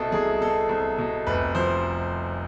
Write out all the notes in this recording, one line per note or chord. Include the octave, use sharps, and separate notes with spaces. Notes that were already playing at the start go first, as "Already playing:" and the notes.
Already playing: C2 B2 A4
C2 G#4
B2 A4
C2
B2
F1 B4
F3 C5